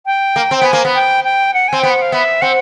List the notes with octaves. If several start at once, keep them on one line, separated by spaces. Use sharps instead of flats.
G5
A#3
C4
G5
B3 G#5
A#3
B3
G5
G5
F#5
C4 G#5
B3 G5
F#5
F5
B3 E5
C4 F#5